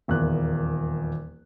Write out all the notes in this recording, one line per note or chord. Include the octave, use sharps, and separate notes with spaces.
D#1 E2 A#3 F#6